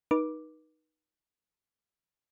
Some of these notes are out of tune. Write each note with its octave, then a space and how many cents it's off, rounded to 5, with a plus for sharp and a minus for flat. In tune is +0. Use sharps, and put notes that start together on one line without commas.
D#4 +0 B4 -35 D6 +0